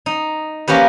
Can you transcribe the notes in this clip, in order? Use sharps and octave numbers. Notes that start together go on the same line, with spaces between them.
D#4
F3 A#3 C#4 G4 B4